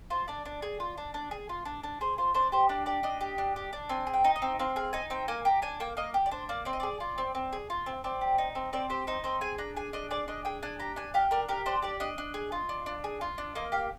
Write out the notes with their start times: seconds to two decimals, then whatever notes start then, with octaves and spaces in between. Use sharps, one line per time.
0.10 F4 C5
0.28 D4 D5
0.45 D4
0.62 G#4
0.80 F4
0.98 D4
1.14 D4
1.31 G#4
1.49 F4
1.65 D4
1.83 D4
2.01 G#4 C5
2.18 F4 C5
2.34 D4 C5
2.52 G4 C5
2.69 D4 D5
2.86 G4 D5
3.03 D4 D#5
3.21 G4
3.38 D4
3.56 G4
3.73 D4
3.89 C4 G#5
4.07 G#4
4.14 G5
4.24 D#4
4.36 D#5
4.42 C4
4.59 C4 F5
4.76 G#4 F5
4.93 D#4 G#5
5.10 C4 G5
5.28 A#3 G#5
5.45 G4 A#5
5.62 D4 G#5
5.80 A#3 G5
5.97 A#3 D#5
6.14 G4
6.26 D5
6.31 D4 C5
6.49 A#3 D5
6.65 C4 D5
6.73 D#5
6.80 G#4 D5
7.00 F4
7.18 C4
7.35 C4
7.53 G#4
7.70 F4
7.86 C4
8.04 C4 D5
8.21 G4
8.38 D#4
8.55 C4
8.73 C4 D5
8.90 G4 C5
9.07 D#4 C5
9.24 C4 C5
9.41 G#4 G#5
9.58 D4 A#5
9.76 G#4 G#5
9.93 D4 D#5
10.11 G#4 D5
10.28 D4 D#5
10.45 G#4 G5
10.63 D4 G#5
10.79 G4 A#5
10.96 D4 G#5
11.14 G4 F5
11.31 D4 A#4
11.49 G4 A#4
11.66 D4 C5
11.82 G4 D5
12.00 D4 D#5
12.18 D4
12.34 G#4
12.52 F4
12.69 D4
12.86 D4
13.04 G#4
13.21 F4
13.38 D4
13.55 A#3 D#5
13.72 G4 F5